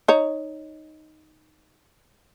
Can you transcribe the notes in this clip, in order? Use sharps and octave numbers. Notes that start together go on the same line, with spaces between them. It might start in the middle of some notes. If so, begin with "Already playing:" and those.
D#4 C#5 A#5